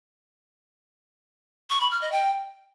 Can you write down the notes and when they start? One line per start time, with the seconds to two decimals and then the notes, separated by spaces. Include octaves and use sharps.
1.70 C#6
1.80 B5
1.91 F6
2.01 D#5
2.12 G5